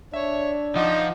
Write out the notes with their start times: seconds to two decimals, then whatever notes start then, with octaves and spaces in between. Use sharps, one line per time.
0.14 D4 C#5 E5
0.76 F3 D#4 D#5 F#5 D6